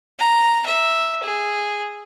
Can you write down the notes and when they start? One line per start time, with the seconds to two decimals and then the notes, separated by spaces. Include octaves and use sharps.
0.19 A#5
0.66 E5
1.23 G#4